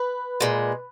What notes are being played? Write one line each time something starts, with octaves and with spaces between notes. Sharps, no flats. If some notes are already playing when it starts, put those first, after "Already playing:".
Already playing: B4
A#2 G#3